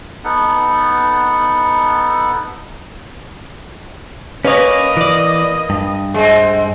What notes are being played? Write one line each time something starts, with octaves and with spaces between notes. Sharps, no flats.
B3 D#4 A4 F#5
A#3 C#4 A#4 B4 C#5 D#5
E3 D5
G2
G#3 C4